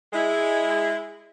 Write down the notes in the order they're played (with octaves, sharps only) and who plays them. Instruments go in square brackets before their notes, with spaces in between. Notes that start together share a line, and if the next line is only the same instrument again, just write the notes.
[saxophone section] G#3 E4